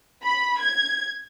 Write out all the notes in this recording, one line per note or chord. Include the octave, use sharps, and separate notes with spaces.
B5
G#6